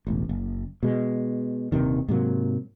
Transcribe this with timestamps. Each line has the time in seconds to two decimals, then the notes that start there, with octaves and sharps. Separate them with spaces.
0.07 E1 A1
0.29 F#1
0.83 B2 G#3
1.72 D#1 G2 C3 D#3
2.08 G#2 C3 F#3 A#3